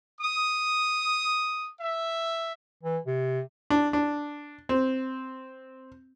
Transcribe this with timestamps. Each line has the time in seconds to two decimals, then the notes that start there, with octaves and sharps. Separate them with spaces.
0.20 D#6
1.80 E5
2.83 E3
3.06 C3
3.70 D4
3.93 D4
4.69 C4